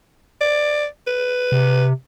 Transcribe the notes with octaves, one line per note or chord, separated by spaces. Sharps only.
D5
B4
C3